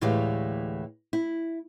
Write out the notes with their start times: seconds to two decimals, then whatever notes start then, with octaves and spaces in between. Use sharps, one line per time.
0.01 D2 A2 E3 G#3 G4 F5
1.13 E4